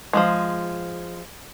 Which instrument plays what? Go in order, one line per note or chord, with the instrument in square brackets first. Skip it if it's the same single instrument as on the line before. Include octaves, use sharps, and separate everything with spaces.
[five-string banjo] F3 F#3 G#3